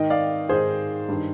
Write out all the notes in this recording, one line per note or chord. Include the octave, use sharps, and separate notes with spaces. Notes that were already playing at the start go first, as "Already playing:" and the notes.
Already playing: G#2 D#3 D#5 G5
D5 F5
G#2 D#3 G#4 C5
G2 D#3